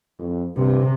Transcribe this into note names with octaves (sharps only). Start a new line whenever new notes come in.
F2
G2 C3